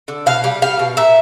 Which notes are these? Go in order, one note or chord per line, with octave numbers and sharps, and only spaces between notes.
D3
B2 F5
G3
G3 F5
B2
A#2 E5